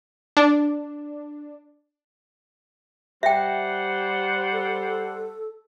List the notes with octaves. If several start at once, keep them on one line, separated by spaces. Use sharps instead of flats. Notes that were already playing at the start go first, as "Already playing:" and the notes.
D4
G3 C5 E5 F#5 G5
A4